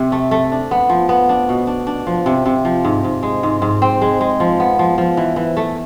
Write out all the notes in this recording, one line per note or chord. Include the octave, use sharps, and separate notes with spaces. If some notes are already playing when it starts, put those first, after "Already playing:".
Already playing: C3
A3
A3
D4
B3
F3
B3
D4
B2
D4
D4
F3
C3
C3
F3
G#2
G#2
G#3
G#2
G#2
C4
G#3
G#3
F3
B3
F3
F3
E3
E3
A3